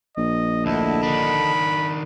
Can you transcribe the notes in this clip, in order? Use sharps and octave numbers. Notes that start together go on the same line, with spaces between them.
A#1 D#5
D2 D3 E4 D#5 A5
D#3 D4 B5